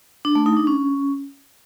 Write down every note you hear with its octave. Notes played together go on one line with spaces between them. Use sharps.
D4
A3
D#4
D4
C#4